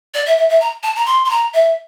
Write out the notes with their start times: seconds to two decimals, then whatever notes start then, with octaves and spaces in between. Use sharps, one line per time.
0.14 D5
0.26 E5
0.38 E5
0.49 E5
0.60 A#5
0.83 A5
0.96 A#5
1.06 C6
1.25 C6
1.30 A#5
1.53 E5